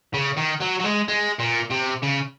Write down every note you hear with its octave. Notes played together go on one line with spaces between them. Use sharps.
C#3
D#3
F#3
F#3
G#3
G#3
A#2
C3
C#3